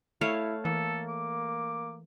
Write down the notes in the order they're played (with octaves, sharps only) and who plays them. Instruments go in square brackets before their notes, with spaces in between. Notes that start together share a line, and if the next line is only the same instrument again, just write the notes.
[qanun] A3 C#5 F5 [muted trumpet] E4
[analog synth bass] E3 [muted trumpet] A#3 [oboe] A4
[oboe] D6